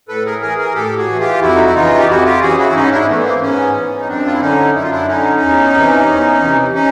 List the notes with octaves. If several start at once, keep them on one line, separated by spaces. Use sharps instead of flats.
A2 A4 B4
G#4 A#4
E3 G#4 A#4
G#4 A#4
A2 G4 A4
F#4 G#4
E3
F4 G4
F2 E4 F#4
D#4
E4
C#3 E3 D#4 F4
G4
F2 E4 F#4
F4 G4
C#3 E3 F#4 G#4
E4 F#4
E4
G#2 C#4 D#4
D4 E4
E3 A3 B3
B3
A#3 C4
G#2 B3 C#4
E3
D#4
F#2 C4 D4
F4
E4
D3 C#4 D#4
F#2 E4
F4
D4 E4
D3 C#4 D#4
E2
C3 E3
E2
C3 E3
C#4 D#4